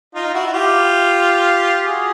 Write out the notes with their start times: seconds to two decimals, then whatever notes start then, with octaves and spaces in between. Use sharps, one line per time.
0.15 D#4 F4
0.34 E4 F#4
0.46 F#4
0.53 F4 G4
1.86 F#4 G#4